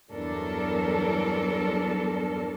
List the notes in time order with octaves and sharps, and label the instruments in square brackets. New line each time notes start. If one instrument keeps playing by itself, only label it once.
[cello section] E2 G2 F#3 D4 A4 A#4